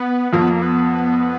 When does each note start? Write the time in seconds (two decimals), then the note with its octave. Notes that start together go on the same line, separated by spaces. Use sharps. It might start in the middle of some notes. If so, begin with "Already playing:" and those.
Already playing: B3
0.33 F2 F3 A#3
0.41 B3
0.50 A#3
0.62 B3